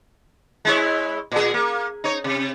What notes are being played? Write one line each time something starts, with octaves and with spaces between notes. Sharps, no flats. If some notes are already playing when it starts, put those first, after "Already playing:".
G#3 E4 C#5
A#2 G#4
A#3
D#4 C#5
C3